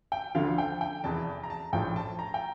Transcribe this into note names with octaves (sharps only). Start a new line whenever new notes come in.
G5
D2 D3 F3 F5
G5
G5
F1 E2 E3 A5
A#5
A5
A#1 A2 F3 G5
A5
A#5
G5